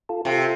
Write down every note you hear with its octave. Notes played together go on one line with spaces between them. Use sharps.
F4 A4
C3 F4 A4